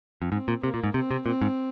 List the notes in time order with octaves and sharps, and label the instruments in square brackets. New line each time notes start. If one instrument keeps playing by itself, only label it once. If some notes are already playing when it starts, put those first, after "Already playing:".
[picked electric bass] F2
[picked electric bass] G#2 [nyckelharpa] C4
[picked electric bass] A#2
[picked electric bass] C3 [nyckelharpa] A#3
[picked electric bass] A#2
G#2
[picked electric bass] C3 [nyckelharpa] C4
[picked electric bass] C3
[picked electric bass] A#2 [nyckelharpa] C4
[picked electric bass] G#2